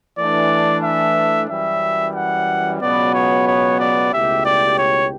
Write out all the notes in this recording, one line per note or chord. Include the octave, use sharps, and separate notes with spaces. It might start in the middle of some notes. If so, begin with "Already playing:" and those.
E3 A3 D4 D5
E5
F#2 E3 G3 E5
F#5
C#2 B2 F#3 B3 D5
C#5
C#5
D5
C#2 B2 A3 E4 G4 E5
D5
C#5